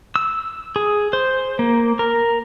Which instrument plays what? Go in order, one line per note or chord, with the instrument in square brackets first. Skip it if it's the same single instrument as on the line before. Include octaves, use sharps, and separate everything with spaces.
[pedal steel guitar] E6
G#4
C5
A#3
A#4